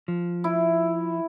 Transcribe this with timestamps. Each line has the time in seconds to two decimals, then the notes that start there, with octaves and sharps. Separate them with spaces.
0.08 F3
0.44 E4